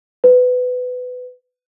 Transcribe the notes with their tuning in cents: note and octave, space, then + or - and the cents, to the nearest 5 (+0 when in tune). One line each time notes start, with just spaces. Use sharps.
B4 +20